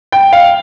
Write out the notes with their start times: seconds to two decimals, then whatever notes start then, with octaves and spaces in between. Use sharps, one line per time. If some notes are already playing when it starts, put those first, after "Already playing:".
0.12 G5
0.33 F5